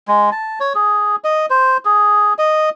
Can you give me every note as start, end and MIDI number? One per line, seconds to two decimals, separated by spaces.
0.08 0.30 56
0.32 0.59 81
0.60 0.73 73
0.75 1.16 68
1.24 1.46 75
1.50 1.77 72
1.85 2.34 68
2.38 2.70 75